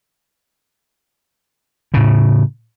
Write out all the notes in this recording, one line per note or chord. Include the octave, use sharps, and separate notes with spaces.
A2 C#3